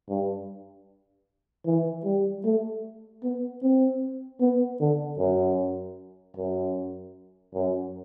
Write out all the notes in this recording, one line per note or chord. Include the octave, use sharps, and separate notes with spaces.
G2
E3
G3
A3
B3
C4
B3
D3
F#2
F#2
F#2